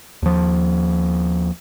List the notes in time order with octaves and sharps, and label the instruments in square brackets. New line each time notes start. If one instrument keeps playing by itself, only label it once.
[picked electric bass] D#2 F3